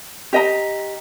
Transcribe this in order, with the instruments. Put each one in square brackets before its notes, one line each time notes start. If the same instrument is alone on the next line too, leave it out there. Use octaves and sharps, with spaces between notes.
[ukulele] G4 D#5 A#5